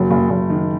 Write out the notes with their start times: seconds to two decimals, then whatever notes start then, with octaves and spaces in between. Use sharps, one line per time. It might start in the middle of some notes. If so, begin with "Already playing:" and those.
Already playing: F#1 F#3
0.11 F#1
0.30 F#1
0.50 D#3